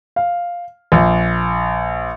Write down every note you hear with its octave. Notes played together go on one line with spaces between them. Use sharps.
F5
A#1